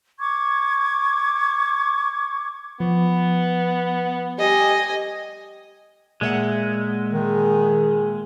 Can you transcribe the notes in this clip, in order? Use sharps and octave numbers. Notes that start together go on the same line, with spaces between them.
C#6 D6 G#6
F3 B3
G3 G4 D#5 G#5
A#2 G#3 E5 F#5
D#3 G#4